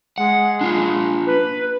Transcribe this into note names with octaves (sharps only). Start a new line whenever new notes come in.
G#3 F#5
D4 F4
B4